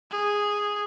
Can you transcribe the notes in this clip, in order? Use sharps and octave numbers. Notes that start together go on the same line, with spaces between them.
G#4